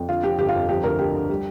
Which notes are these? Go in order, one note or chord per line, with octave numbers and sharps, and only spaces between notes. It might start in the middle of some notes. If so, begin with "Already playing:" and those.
Already playing: F2
D3 F4
F3 G4
G1 G4
F4
F2
F3 G4
D2 A#4
D2 G4
D3
G3